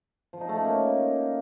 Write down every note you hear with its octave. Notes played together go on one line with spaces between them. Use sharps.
F3
D#4
A3
C#4
A#3